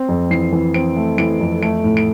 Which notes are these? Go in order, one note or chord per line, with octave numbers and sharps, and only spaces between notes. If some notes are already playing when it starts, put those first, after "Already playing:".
Already playing: C4
F2
E3 C7
E3
C4 D7
A3
E3 D7
F2
A3 D7
A2
D7